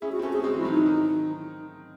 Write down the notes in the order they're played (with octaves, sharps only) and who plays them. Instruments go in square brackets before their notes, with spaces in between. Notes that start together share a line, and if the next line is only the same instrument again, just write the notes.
[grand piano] C#4 E4 [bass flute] G#4
[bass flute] F#4
[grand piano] C4
[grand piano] A3 C#4 [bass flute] F#4
[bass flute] G#4
[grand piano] G#3 C4 [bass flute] F#4
[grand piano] E3 G#3
[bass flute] E4
[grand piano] D#3 F#3
[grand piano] E3 [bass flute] D#4
[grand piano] D#3